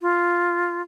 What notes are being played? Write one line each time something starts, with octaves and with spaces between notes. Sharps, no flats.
F4